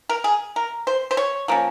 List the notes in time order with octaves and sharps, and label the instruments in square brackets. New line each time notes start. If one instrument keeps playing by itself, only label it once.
[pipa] A#4
G#4
A#4
C5
C5
C#5
F3 A#3 C#4